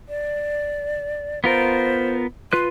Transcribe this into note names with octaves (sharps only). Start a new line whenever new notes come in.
D5
B3 F4 A#4 C5
F4 B4 C6 F#6